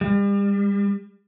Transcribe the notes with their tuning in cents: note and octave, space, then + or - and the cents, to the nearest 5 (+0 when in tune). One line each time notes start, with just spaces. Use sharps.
G3 +40